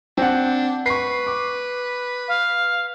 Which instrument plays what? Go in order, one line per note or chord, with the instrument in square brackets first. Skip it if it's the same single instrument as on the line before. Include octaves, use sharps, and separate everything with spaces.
[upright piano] C4 F#5 [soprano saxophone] D4
[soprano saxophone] B4 [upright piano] C#6 C7
[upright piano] D6
[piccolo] F5